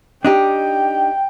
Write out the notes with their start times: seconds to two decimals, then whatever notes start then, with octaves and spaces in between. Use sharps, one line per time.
0.25 D4 D#4 G4 G5